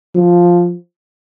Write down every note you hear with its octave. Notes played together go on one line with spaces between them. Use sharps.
F3